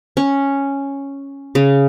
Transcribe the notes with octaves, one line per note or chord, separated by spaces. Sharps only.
C#4
C#3